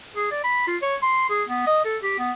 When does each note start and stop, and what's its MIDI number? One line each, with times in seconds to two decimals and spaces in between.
0.16 0.27 68
0.31 0.43 74
0.44 0.63 83
0.67 0.77 65
0.82 0.96 73
1.02 1.29 84
1.30 1.43 68
1.49 1.62 59
1.66 1.80 75
1.84 1.97 69
2.03 2.15 67
2.18 2.32 59